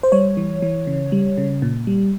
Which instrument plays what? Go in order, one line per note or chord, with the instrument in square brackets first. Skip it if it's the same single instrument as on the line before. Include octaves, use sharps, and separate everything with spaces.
[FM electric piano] C5
G3 C#5
E3
E3
C#3
G3
C#3
A#2
G3